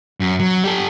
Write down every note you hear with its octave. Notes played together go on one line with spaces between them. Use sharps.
F#2
F#3
G4 A4